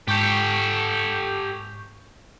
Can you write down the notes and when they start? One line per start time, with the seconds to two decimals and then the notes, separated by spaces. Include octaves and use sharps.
0.08 G#2 G4 A4 C#6 G6